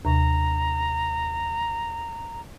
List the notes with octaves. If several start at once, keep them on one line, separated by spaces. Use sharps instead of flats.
D#2 C3 A#5